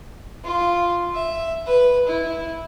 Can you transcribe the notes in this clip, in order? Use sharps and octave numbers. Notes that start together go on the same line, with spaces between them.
F4
E5
B4
E4